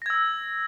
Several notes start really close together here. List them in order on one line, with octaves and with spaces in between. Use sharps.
A#6 G#6 E6